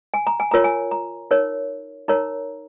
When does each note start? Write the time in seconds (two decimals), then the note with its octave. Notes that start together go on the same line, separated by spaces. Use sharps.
0.14 G#5
0.27 A#5
0.40 G#5
0.51 F4 A#4 C#5 A#5
0.64 G#5
0.91 A#5
1.31 D#4 A#4 C#5
2.08 D#4 A#4 C#5 A#5